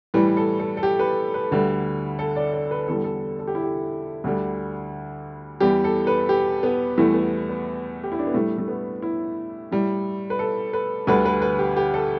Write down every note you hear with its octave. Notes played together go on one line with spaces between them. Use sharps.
A2 E3 G3 B4
A4
A4
A4
G4
B4
B4
D2 D3 G3
A4
D5
D5
B4
E2 D3 G3 A4
A4
A4
G4
E4
G4
D2 D3 G3
E2 E3 G3 G4
A4
B4
G4
B3
E2 E3 G3 A3
B3
B3
G4
E4
D4
B3
A2 G3 A3
A3
B3
E4
A2 G3
B4
A4
B4
D2 D3 G3 B4
B4
B4
G4
G4
A4